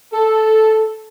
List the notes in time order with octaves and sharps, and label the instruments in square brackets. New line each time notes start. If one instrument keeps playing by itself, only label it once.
[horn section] A4